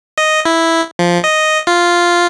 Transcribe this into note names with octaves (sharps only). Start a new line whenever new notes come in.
D#5
E4
F3
D#5
F4